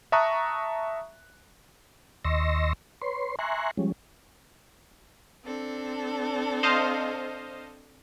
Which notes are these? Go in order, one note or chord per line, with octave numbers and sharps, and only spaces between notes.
E5 A5 A#5 C#6 D#6 F#6
D#2 D#5 C6 C#6 E6 A#6
B4 C#5 C6
E5 G#5 A#5 C6 C#6 F#6
F3 G3 G#3 C#4
C4 D4 A4
C5 D#5 F5